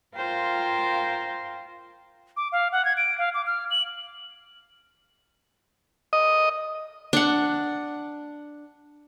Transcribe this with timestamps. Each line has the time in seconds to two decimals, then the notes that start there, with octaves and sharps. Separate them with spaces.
0.16 F4 A#4 C5 F5 G5
2.37 D6
2.52 F5
2.72 F#5
2.85 G#6
2.97 D7
3.18 F5
3.34 D6
3.47 F6
3.71 F#7
6.13 D#5
7.13 D4 F#5